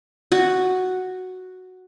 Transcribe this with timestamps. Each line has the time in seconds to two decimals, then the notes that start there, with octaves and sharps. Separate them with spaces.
0.32 F#4